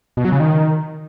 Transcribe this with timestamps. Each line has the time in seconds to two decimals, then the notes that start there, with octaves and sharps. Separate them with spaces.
0.17 B2
0.25 F#3
0.32 C#3
0.40 D#3